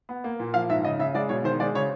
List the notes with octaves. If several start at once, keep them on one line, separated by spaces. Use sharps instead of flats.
B3
A#3
A#2
F3 F5
G#2 E5
C#3 D#5
C#3 E5
G#3 D5
B2 C#5
D#3 C5
G#3 D5
C#3 C#5